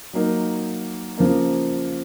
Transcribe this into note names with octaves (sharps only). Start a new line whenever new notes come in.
F#3 A#3 D#4
C#3 F3 A#3